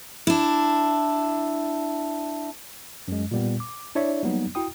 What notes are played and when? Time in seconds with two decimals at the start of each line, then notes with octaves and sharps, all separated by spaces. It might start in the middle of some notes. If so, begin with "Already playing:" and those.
0.27 D4 E4
3.08 F#2 G#3
3.31 A#2 G3 B3
3.60 D6
3.95 D4 E4 C#5 D5 E5
4.23 F#3 G3 A#3 B3 D#4
4.55 E4 F#4 G5 D#6